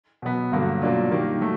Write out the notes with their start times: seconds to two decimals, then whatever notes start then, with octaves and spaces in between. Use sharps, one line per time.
0.22 B2 F#3 B3
0.52 G2 D3 F#3 A#3
0.82 B2 F#3 A#3 D4 F4
1.11 D#3 G3 A#3
1.41 F#3 A3